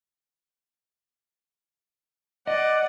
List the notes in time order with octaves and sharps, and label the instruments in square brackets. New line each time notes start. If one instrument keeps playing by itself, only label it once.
[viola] D5 F#5 [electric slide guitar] D#5